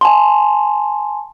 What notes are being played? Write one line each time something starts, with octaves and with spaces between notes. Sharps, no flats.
G#5 A5 C6